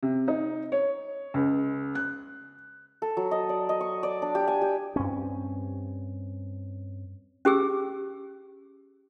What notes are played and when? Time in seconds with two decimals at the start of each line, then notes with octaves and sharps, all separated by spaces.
0.03 C3
0.28 D#4
0.72 C#5
1.34 C#2
1.95 F#6
3.02 A4
3.17 F#3
3.31 D#5
3.49 D5
3.69 D#5
3.81 C#6
4.03 D5
4.22 D4
4.35 G4
4.47 G#5
4.61 G4
4.96 G2 C4 C#4
7.45 C#4 G4 G#4 E6